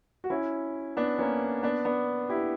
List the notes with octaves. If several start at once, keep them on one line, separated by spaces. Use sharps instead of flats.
F#4
C#4 E4
B3 D4
A#3 C#4
B3 D4
B3 D4
E4 G4